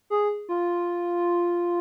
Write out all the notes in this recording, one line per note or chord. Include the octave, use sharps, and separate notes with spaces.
G#4
F4